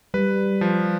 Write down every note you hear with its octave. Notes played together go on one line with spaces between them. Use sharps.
G3 B4
F3